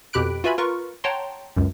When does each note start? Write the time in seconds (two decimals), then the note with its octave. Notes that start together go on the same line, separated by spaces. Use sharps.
0.13 F2 B2 G4 B5 F#6 D7
0.44 F4 F#4 B4 E5 G#5 B5
0.58 F4 A#4 B4 C#6
1.04 C#5 F#5 G5 A5 A#5 C6
1.57 C#2 F#2